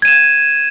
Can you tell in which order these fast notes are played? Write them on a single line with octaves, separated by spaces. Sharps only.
G#6 D#7 E7